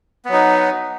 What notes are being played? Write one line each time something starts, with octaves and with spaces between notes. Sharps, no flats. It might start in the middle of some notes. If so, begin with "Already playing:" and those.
F#3 B3 D#4